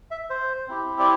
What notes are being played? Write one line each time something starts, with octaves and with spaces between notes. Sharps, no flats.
E5
C5
C4 E4 G4
D5